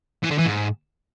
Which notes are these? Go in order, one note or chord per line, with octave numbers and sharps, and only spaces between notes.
E3
D3
E3
G#2